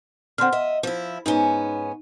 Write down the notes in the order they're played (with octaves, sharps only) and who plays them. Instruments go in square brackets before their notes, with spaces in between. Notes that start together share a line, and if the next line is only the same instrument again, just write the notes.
[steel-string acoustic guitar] D3 C4 [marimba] F#5 C6 F6
[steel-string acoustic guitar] D#5 E5
F3 E4
[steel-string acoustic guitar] G#2 B3 C#4 [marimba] D#4